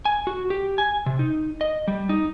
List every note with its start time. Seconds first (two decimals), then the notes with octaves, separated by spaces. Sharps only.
0.05 G#5
0.27 F#4
0.50 G4
0.78 G#5
1.06 C3
1.19 D#4
1.61 D#5
1.88 G3
2.09 D#4